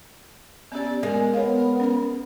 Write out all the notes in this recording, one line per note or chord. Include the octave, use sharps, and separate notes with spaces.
B3 C#4 G4 D5
G#3 B3 A#4 G#5
B3 C#5 F5
C#4